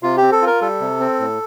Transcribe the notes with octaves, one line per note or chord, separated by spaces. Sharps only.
C3 F4
G4
C4
A4
F4
A#4
G3 A4
C3
C4
A2